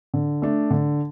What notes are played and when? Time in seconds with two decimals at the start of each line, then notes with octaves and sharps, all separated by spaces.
0.14 D3
0.42 A3 D4
0.71 D3